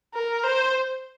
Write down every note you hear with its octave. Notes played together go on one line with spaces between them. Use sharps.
A#4
C5